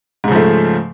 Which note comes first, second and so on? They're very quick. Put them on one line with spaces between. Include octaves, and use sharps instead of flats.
G#2 C#3 F3 A3